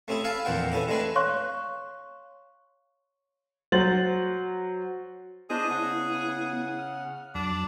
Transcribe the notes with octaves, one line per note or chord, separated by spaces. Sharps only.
A3 C4 C#4 E4 G#4
E5 F5 G#5 A5 B5
A#1 E2 A#2 C4 F#5 G5
E3 C#4 A4 B5
G#3 A3 C4 D4 B4 G#5
C#5 F5 C6 C#6 F#6
F#3 C5 A6 F#7
B3 D4 E4 G#4 C5 D#5
C#3 F#5
F6
F2 F#3 D4